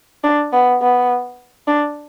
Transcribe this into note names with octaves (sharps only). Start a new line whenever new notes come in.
D4
B3
B3
D4